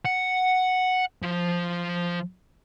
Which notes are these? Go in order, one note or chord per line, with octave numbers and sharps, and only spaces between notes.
F#5
F3